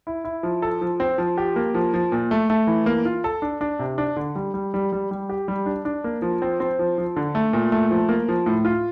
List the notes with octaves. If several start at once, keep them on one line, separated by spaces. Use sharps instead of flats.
E4
E4
F3
A4
F3
C4
F3
G4
A#3
F3
F3
A#2
A3
A3
E3
A#3
F4
A4
D4
D4
C3
D4
D3
G3
G3
G3
G3
G3
G4
G3
D4
D4
A#3
F3
C4
C4
F3
F3
D3
A3
A#2
A3
F3
A#3
F3
A2
F4